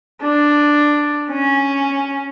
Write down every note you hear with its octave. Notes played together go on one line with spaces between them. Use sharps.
D4
C#4